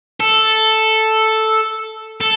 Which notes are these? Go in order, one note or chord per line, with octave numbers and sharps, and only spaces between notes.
A4
A4